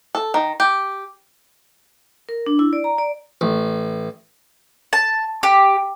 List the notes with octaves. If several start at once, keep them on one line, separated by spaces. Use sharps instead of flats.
A4
D#3
G4
A#4
D4
E4
D5
A#5
D5
A1
A5
G4